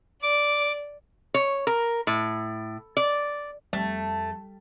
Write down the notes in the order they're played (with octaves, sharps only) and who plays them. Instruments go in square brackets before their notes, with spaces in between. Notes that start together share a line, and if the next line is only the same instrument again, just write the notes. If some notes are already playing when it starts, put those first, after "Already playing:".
[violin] D5 [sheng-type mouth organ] D6
[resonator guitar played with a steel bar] C#5
A#4
A2
D5
[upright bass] F2 [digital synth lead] G3 [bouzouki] A3